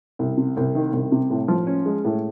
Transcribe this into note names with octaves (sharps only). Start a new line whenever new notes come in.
C2
C3
C2
D#3
C2
C3
A2
F3
C#4
G#3
A2